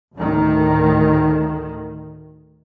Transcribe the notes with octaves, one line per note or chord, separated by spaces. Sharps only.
D2 A2 D#3